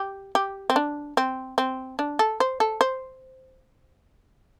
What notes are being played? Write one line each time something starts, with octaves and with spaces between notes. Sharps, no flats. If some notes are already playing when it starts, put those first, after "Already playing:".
Already playing: G4
G4
C4
D4
C4
C4
D4
A4
C5
A4
C5